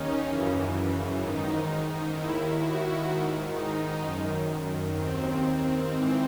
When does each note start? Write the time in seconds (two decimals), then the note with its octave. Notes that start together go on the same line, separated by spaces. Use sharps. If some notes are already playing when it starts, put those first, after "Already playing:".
Already playing: D#2 D#3 C#4 D#4
0.25 F#2 C#3 E3
1.19 G#2 D#3 D#4
2.13 D#2 D#3 E4
2.60 F#4
3.07 G#2 D#3
3.53 D#4
4.00 F#2 D#3
4.94 D#2 D#3 C4
5.88 G#2 E3 C4